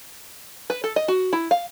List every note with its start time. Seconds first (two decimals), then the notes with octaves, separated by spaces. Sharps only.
0.70 B4
0.84 A4
0.96 D#5
1.08 F#4
1.33 E4
1.51 F5